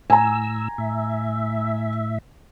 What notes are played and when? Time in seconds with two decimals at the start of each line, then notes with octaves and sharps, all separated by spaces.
0.10 A2 G#5 A#5 E6
0.78 A2 E5